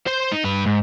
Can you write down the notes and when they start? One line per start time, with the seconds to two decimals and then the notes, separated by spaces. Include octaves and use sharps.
0.06 C5 C6
0.32 D#4
0.44 G2 B4
0.66 G#2